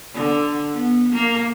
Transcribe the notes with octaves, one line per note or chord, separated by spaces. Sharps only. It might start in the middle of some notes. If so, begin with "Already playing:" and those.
D3
B3
A#3